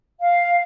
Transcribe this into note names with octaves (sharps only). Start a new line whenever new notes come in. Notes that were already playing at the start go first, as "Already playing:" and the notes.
F5